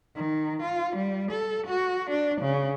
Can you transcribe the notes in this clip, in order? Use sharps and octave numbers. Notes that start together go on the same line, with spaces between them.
D#3
F4
G3
A4
F#4
D4
C#3